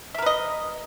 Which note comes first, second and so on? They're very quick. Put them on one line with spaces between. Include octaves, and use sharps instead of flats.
E5 A#4 B4 D#5